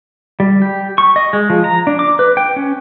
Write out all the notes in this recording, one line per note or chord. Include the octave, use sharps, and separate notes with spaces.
G3
G4
C#6
D#5
G#3
F3
A#5
D4
D6
B4
G5
C#4